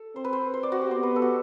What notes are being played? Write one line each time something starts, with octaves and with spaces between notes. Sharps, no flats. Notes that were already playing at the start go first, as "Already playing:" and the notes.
Already playing: A4
C4 C5
B4
C5
C5
D5
F#4
G4
B3 C5
B4
A4
F#4